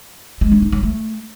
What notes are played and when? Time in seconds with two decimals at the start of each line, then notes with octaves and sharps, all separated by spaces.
0.41 G#3
0.52 D4
0.62 D#4
0.72 F#3
0.83 A3